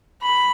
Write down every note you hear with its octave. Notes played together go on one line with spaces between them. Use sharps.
B5